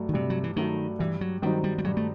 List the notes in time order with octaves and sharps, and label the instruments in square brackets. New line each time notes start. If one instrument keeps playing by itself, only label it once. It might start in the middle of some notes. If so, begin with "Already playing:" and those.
Already playing: [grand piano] G2 F#3 A3
[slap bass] D#3
[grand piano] G2 [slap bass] C3
[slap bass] F#3
E3
[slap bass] D#3 [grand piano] F#3 A3
[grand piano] G2 [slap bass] E3
[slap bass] F#3
[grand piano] D#3 F#3 C4 D#4 [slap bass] G3
[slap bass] G3
G3
[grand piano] G2 [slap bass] F#3
[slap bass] A3